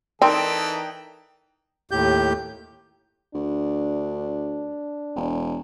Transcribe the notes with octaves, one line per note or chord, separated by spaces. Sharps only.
E3 C4 D#4 A4 A#4 D5 G5 D7
D#2 A2 G4 G6
D2 D4
E1